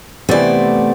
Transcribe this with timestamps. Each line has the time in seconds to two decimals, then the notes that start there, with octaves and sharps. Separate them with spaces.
0.29 C3 E3 A3 B3 C5 D5